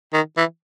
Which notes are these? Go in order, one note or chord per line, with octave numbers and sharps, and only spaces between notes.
D#3
E3